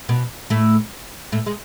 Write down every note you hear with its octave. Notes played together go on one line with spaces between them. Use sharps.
B2 B3
A2 A3
A2 A3
G#3